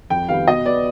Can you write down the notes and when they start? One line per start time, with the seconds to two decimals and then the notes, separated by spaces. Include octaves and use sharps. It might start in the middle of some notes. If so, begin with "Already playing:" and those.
0.10 F2 G5
0.29 D#3 G3 B3 F5
0.47 B2 D#5
0.65 B3 D5